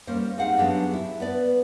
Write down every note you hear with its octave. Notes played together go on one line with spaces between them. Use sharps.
G3 A#3 C#4 C5
C4 D#4 G4 G#4 F5 F#5
F#3 B3 D4 G4 G#4
E4
B3 B4 D5